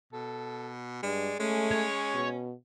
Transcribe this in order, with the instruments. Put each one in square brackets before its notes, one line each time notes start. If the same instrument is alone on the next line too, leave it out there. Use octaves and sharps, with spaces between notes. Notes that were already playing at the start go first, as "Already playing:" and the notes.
[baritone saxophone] B2 [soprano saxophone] A4
[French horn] G2 [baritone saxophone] G#3 [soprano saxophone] D5
[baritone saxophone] G#3 [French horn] A3 [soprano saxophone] C#4
[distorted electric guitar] C#5
[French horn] B2